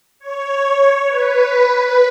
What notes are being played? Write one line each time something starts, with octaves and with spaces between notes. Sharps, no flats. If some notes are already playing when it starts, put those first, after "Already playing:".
C#5
B4